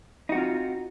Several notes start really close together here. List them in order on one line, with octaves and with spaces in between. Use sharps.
D#4 F#4 C4 F4